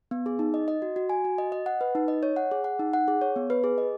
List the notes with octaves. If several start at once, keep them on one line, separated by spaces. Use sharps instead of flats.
B3
G#4
D#4
D#5
D#5
F#4
F#4
G#5
F#4
D#5
D#5
F#5
B4
D#4
D#5
C#5
F#5
G#4
F#5
D#4
F#5
G#4
C#5
B3
B4
G#4
D#5